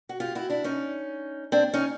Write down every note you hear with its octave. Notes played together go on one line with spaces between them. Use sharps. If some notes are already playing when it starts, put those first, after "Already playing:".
F#4
F4 G4
E4 F#4
D4 E4
C#4 D#4
C4 D4
C#4 D#4